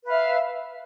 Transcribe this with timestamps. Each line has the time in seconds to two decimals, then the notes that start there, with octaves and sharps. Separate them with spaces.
0.04 B4
0.07 F5
0.10 E5